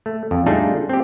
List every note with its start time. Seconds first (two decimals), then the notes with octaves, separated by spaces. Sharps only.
0.06 A3
0.31 F2
0.46 G3 A3 D4 D#4 F4 G#4
0.89 C4 G4